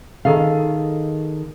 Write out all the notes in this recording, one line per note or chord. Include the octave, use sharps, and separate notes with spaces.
D#3 G#4 A4 F5